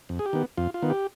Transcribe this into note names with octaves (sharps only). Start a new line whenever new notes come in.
F2
G#4
G4
D#3 B3
F2 F4
F4
D#3 B3
G4